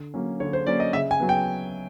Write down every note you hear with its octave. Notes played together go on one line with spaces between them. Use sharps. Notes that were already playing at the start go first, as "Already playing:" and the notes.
Already playing: D3
F#3 A#3 C#4
D3 C#5
C5
F#3 A#3 C#4 D5
D#5
C#3 E5
G#5
F#3 B3
G5